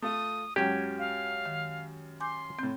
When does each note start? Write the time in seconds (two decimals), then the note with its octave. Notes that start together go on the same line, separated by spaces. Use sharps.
0.02 A3 F4 D#6
0.56 F#2 F#3 G#3 C#4 G4 G5 G#6
0.99 F5
1.46 D#3
2.20 G#5 C6 D6 G6
2.59 A2 C4 G6